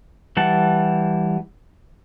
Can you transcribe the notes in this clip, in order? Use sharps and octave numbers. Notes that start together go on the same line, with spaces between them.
E3 G3 F#5 A5